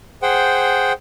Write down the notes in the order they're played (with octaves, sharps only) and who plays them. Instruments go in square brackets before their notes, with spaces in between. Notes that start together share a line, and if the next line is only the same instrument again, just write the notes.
[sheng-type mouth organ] G#4 C5 F#5 G5